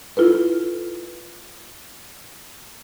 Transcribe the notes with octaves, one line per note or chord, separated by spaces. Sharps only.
E4 F4 A4 B4